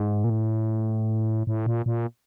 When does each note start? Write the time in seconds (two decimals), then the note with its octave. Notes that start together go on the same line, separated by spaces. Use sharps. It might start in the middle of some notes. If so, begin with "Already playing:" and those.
Already playing: G#2
0.24 A#2
0.30 A2
1.47 A2
1.66 A#2
1.86 A#2